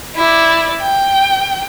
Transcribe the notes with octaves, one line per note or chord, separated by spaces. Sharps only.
E4 D5
G5